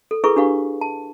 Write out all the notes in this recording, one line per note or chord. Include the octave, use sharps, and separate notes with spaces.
A4
E4 G#4 A4 B4 C#6
D4 G4 B4 F5 C#6
A5